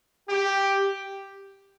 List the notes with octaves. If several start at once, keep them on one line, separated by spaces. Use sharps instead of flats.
G4